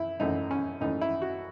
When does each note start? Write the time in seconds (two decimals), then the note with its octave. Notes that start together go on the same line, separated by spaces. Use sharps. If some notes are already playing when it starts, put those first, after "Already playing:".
Already playing: F#2 E4
0.20 G#1 F#2 E3 A3 D#4
0.51 C#4
0.80 G#1 F#2 E3 A3 D#4
1.01 E4
1.22 F#4